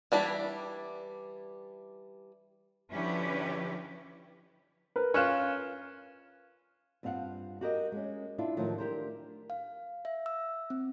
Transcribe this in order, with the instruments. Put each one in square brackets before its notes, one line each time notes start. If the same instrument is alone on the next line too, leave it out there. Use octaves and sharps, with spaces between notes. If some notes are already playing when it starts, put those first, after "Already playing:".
[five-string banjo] E3 G3 D4 E4
[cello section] D3 F3 C#4 E4 G4 B4
[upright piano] A#4 B4
[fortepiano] C#4 F4 [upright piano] F6 F#6 E7
[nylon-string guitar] G2 C4 F4 F5 F#5
F#4 G4 A#4 D#5
G#3 C#4
D4 E4 F4
A2 D#3 F3 F#3
D4 G4 A#4 C5
[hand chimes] F5
E5
E6
C4